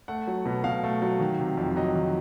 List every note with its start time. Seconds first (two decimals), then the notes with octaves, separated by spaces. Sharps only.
0.08 A3 F#5
0.27 F#3
0.46 B2
0.64 B2 F5
0.83 A3
1.02 F#3
1.20 D#3
1.39 C3
1.57 F2
1.76 F#3 D#5
1.95 D#3